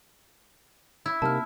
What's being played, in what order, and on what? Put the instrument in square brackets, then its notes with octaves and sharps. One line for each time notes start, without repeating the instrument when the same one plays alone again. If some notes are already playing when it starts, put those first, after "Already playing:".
[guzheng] E4
[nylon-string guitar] C3 A#3 D#4 [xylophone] A5 F6